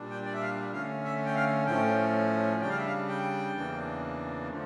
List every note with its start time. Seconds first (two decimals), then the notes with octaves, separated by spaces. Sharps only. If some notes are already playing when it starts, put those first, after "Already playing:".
Already playing: A#2 G3 D4
0.11 G5
0.25 D5
0.33 E5
0.41 F5
0.73 D3 A3 C#4 F5
1.05 E5
1.26 G5
1.35 F5
1.66 A2 F3 A3 C#4 G5
2.61 C#3 G3 D4 G5
2.69 F5
2.78 E5
2.86 F5
3.08 G5
3.55 E2 C#3 E3 A#3 D4
4.50 D3 F3 A3